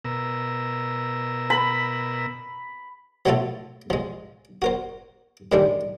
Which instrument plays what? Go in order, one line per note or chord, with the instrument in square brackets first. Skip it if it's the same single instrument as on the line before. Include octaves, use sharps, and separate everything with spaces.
[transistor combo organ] B2 A#4 E6
[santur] B5
[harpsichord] F3 F#3 A3 E4 F4 A4
F3 G#3
F#4 A#4 C5
A2 D#3 G3 G#3 D4